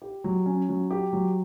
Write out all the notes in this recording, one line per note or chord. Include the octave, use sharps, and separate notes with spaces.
G4
F#3
C#4
F#3
G4
F#3